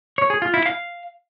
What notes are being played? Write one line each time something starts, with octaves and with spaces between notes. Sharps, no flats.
C#5
G#4
F4
E4
F5